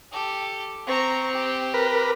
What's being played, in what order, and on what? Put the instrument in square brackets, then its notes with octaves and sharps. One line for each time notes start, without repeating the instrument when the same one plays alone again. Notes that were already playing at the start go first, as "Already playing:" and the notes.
[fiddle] G4 A4
[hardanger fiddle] C4 [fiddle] A#5 C#6
[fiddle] G4
[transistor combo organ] A#4 B4